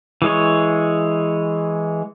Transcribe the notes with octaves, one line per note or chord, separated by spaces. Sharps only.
E3 G#3 C#5